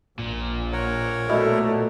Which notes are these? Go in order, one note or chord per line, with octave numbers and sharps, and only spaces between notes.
A#1 A#2
A#4 C#5 F#5
B2 A3 E4 D5